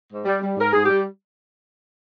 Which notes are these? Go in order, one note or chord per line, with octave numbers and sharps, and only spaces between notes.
G#2
G3
G3
G#2 A#4
G#2 G#4
G3 G4